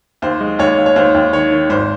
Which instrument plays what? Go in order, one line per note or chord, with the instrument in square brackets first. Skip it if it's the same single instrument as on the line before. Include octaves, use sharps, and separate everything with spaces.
[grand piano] D#2 C5
G#3
D#2 C#5
D#2
C#5
D#2 C5
D#2
D#3 C#5
D#3
G#1 C5